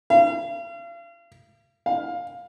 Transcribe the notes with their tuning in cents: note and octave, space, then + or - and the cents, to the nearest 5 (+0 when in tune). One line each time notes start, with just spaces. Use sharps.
F5 -40
F5 +15